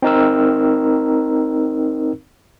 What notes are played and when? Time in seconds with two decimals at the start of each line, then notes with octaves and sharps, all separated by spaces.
0.02 C4 D#4 A#4 E6